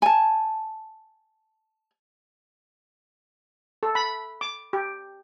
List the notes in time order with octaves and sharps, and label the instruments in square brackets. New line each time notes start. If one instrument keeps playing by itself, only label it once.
[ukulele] G#5 A5
[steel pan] A4
B5
D6
G4